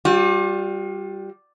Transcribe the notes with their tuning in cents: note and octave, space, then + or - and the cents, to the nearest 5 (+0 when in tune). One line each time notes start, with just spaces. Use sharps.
G3 -5 F4 +40